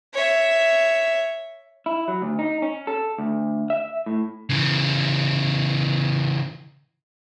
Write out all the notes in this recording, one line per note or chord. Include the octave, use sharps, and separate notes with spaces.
C#5 E5
E4
F#3
D2
D#4
C#4
A4
D2
E5
A2
C#3 E3